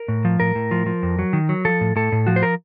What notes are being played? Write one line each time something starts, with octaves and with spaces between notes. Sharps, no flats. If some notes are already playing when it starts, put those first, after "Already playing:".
Already playing: A#4
A2
F3
A2 A#4
A2
F3
F3
F2
F#3
D#3
F#3
F3 A4
A2
A2 A4
A2
F3 F#4
C5
A#4